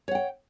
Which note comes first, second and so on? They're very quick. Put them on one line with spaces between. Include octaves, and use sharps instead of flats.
C#5 F#5 G5